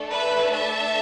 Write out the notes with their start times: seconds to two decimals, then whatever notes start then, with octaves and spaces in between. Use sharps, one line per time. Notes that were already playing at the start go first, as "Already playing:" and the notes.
Already playing: A3 D4 A4
0.11 B4 E5
0.54 E5 A5